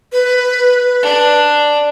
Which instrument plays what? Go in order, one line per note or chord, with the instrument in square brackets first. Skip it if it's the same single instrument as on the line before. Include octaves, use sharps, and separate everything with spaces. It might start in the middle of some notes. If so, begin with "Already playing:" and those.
[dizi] B4
[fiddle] D4